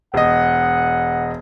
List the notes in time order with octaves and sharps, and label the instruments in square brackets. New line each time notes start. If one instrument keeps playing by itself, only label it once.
[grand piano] E1 D#5 [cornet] F#5